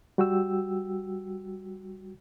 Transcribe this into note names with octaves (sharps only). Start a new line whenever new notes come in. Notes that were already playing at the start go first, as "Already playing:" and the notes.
G3 F#4 G5 E6